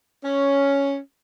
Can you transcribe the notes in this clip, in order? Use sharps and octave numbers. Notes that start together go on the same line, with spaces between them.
C#4